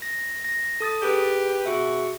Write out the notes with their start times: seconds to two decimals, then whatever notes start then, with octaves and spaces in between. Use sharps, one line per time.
0.02 A#6
0.44 A#6
0.80 A4 D#6 A6
1.02 G4 G#4 B4
1.66 B2 F#4 G#4 E5